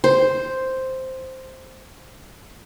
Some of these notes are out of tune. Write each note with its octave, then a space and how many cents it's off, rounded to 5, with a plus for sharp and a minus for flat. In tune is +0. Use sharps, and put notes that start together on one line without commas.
C5 +0